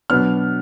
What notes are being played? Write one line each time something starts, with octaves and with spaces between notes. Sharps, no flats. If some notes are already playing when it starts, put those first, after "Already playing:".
B2 F#3 B3 D4 F6